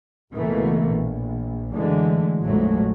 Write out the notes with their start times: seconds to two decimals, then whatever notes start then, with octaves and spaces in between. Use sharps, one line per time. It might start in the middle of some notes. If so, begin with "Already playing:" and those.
0.32 C#2 B2 E3 A3 A#3
0.88 A#1
1.72 F#2 D3 E3 G#3 A3
2.41 A#1 F2 G#2 F#3 G#3 A3